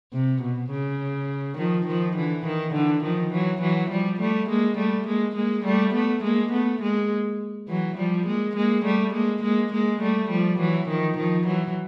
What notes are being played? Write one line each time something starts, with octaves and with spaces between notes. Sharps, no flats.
C3
B2
C#3
D#3 F3
D#3 F3
D3 E3
D#3
D3 E3
D#3 F3
E3 F#3
E3 F#3
F3 G3
G3 A3
G#3 A#3
G3 A3
G#3 A#3
G#3 A#3
G3 A3
A3 B3
G#3 A#3
A3 B3
G#3 A#3
E3 F#3
F3 G3
G#3 A#3
G#3 A#3
G3 A3
G#3 A#3
G#3 A#3
G#3 A#3
G3 A3
F3 G3
E3 F#3
D#3 F3
D#3 F3
E3 F#3